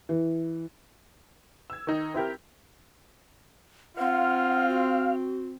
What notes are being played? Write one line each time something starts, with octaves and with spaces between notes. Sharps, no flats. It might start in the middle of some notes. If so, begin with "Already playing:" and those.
E3
E6 G#6
D#3 D#4
C4 E4 G4 A#4
C4 F4 F5 F#5
F#4